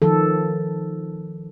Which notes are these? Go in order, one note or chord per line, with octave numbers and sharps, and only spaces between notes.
D#3 F3 A4